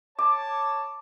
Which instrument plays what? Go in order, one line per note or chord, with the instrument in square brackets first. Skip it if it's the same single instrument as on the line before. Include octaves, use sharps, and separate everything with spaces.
[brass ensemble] C#5 A5 [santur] D6